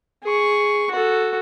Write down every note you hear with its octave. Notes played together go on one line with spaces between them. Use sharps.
G#4 C#6
F#4 A4